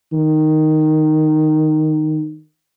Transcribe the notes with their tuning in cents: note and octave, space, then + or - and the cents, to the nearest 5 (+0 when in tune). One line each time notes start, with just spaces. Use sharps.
D#3 -5